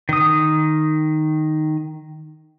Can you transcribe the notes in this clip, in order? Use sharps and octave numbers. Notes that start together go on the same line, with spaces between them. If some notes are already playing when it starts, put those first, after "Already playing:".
D#3 D#6